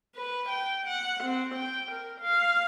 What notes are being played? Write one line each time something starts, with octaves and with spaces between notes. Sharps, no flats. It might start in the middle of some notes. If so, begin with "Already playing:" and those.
B4
G5
F#5
C4
G5
A#4
F5